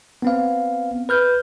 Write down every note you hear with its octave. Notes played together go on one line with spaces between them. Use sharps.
B3 C4 F5
B4 F6 G6